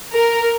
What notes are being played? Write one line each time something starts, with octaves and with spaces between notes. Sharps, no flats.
A#4